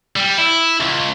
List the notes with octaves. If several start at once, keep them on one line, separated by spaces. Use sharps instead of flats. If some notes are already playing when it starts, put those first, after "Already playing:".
G3
E4
C#2